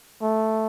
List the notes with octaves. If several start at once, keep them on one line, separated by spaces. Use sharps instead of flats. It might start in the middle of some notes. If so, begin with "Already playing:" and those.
A3